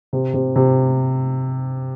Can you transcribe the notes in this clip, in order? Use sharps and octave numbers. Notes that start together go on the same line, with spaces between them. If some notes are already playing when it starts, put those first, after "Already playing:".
C3
C3
C3